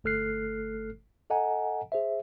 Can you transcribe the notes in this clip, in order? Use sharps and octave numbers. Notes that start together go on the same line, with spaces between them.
G1 A3 A4 F6 F#6 C7
A4 D#5 F#5 G#5 A#5
G#4 C5 E5